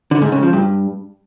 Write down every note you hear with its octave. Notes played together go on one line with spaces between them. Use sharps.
D3
G#2
C#3
F3
G2